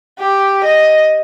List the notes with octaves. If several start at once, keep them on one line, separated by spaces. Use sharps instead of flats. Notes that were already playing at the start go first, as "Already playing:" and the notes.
G4
D#5